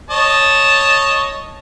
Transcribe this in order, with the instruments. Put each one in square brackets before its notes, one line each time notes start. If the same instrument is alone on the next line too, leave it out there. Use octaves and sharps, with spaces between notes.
[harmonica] C#5 D#5 A5